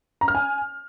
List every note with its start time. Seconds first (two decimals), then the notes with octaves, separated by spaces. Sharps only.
0.21 A#5
0.28 F6
0.35 G#5